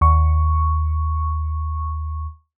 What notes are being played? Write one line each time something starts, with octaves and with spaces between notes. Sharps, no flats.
D#2 C#6